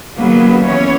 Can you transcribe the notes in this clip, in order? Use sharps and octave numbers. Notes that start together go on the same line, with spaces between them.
D#2 C#3 F#3 A#3 B3 B4
E3 B3 C#4 C#5